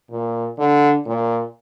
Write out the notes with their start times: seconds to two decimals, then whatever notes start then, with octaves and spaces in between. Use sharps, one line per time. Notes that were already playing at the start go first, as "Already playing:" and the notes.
0.11 A#2
0.59 D3
1.06 A#2